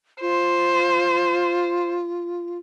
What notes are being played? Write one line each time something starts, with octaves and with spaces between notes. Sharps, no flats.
F4 C5